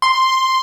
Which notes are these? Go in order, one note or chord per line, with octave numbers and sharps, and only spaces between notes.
C6